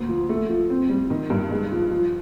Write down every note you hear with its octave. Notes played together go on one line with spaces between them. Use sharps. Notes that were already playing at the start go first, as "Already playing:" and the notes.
Already playing: D2 A#3
F3
A3
F3
C4
G3
D#3
G2
G#3
F3
F3